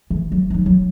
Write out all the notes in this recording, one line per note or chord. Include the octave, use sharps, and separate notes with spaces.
E3
F#3
E3 D#4
F#3